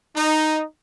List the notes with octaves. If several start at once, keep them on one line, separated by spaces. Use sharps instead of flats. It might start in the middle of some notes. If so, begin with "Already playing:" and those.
D#4